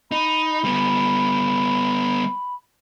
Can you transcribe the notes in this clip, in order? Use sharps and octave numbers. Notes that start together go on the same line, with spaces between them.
D#4 B5
G3 B3